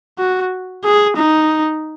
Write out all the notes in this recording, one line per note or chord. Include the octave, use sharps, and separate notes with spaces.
F#4
G#4
D#4